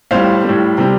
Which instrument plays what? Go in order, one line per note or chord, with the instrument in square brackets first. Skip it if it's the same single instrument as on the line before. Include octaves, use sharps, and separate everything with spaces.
[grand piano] A2 G3 C5 F5
G3
A2
C3 G3